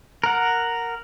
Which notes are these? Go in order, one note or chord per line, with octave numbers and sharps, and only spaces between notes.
A#4 F#5